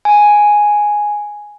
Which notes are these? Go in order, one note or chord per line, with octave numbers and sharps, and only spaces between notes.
G#5